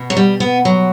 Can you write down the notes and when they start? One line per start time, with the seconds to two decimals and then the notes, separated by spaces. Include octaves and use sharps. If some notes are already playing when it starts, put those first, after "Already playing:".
Already playing: B2
0.10 F#3
0.17 G3
0.40 B3
0.65 F#3